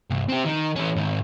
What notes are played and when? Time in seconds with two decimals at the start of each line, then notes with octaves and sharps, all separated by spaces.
0.10 C2 G2
0.29 C4 G4
0.45 D#3 D#4
0.76 E3 C#4
0.96 G#2 D#3